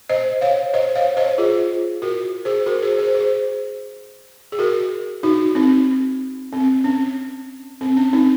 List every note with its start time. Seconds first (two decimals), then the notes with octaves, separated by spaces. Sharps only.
0.10 C5 D#5
0.41 C#5 F5
0.74 C5 D#5
0.95 C#5 F5
1.17 C5 D#5
1.38 F4 G#4
2.02 F#4 A#4
2.45 G#4 C5
2.66 F#4 A#4
2.82 G#4 C5
2.98 G#4 C5
3.15 G#4 C5
4.52 G#4
4.59 F#4 A#4
5.23 D#4 F#4
5.55 C4 D#4
6.53 C4
6.84 C#4
7.81 C4
7.97 C#4
8.13 C4 D#4